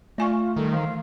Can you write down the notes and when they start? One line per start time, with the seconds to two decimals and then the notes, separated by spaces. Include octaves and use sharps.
0.18 A3 F4 D5 G#5 C#6
0.56 D#3 G3 A4
0.73 E3 F5